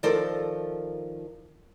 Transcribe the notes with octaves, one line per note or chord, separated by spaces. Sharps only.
D#3 F3 A4 A#4 C5 D5